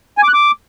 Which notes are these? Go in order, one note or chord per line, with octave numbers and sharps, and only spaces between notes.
G#5
D6
F#6
D6